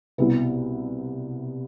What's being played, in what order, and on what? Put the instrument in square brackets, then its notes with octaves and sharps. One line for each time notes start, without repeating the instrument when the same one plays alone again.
[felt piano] C2 B2 B3 E4 B4